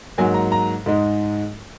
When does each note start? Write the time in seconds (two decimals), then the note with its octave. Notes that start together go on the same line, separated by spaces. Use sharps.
0.18 G#2 F#3 A#3 G#5
0.34 A#5
0.52 A#5
0.86 G#2 G#3 D#4